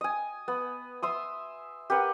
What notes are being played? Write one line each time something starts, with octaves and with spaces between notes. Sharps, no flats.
D#5 G#5
B3
E5 C6 D#6
G4 A#4 B4 F#5